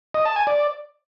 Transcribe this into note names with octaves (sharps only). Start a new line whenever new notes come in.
D#5
A5
G#5
D5